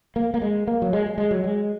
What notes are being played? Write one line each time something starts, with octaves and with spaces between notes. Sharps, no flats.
A#3
A#3
G#3
A#3
F#3
G#3
G#3
G#3
F#3
G#3